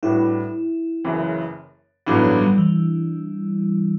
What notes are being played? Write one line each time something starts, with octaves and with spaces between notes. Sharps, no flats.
A2 G3 D4 E4 F#4 B4
F#1 F#2 C#3 E3
A1 G2 D3 F#3 B3 E4
D4
G3
E3